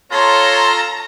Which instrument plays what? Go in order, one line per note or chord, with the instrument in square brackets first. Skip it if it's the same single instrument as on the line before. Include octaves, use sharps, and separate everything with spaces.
[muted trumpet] F4 [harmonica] A4 C6 [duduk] C#5 [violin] A#5